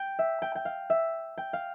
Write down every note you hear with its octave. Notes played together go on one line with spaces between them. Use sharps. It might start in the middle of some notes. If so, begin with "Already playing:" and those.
Already playing: G5
E5
G5
G5
F5
E5
G5
F5